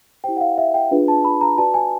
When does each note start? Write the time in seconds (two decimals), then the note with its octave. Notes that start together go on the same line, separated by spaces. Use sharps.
0.24 E4 G4 C5 G5
0.37 F#5
0.41 F5
0.58 E5
0.74 G5
0.91 D4 F4 G#4 B4
1.08 A5
1.25 B5
1.41 A#5
1.58 F#4 B4 D5 A5
1.74 G#5